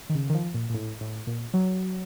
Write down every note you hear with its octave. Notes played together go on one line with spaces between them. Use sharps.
D#3
C#3
D#3
F3
A#2
A#2
A2
A2
A#2
F#3